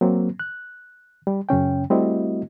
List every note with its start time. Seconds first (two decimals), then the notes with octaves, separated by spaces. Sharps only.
0.01 F#3 A#3 C4
0.40 F#6
1.27 G3
1.49 F#2 C#3 C#4 G5
1.90 G3 A3 C4 E4 F#4 D#5